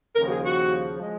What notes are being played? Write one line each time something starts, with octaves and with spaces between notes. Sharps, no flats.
D#2 C#3 F3 A#4
F#4
G#4
F#4
F3 G#3